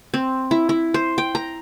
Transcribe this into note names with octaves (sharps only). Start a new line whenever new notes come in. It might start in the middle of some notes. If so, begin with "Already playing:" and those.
C4
E4
E4
C5
G5
A#5